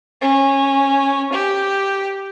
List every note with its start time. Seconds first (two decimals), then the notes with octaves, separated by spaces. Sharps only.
0.22 C#4
1.32 G4